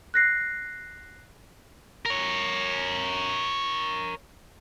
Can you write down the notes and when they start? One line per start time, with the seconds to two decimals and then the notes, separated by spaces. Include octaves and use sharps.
0.14 F#6 A#6 C7
2.06 A#4 C#5